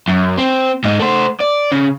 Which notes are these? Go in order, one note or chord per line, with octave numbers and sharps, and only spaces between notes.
F#2
C4
G#2 D#4
A3 C5
D5
C#3